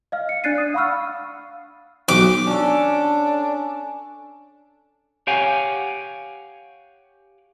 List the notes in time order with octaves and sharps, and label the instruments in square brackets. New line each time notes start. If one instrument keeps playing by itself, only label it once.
[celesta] D#5 F5 F6
C#7
D4 D5 F#6 A6 C7 D#7
D#6 F#6
F5 F#5 B5 C#6 E6 F6
[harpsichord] B1 [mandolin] D6
[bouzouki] C#4 A4 [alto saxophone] D4
[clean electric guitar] G4 C#5 F5 F#5 G#5